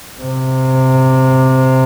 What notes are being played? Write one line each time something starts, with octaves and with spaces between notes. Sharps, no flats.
C3